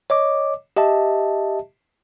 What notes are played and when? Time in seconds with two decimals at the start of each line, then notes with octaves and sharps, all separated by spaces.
0.10 C#5 D#5 D6
0.77 G4 D#5 E5 A5